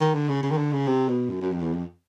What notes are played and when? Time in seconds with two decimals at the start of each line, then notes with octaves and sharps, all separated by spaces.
0.01 D#3
0.14 D3
0.29 C#3
0.43 C#3
0.51 D#3
0.57 D3
0.73 C#3
0.87 C3
1.08 B2
1.30 F#2
1.41 F#2
1.52 F2
1.62 E2
1.73 F2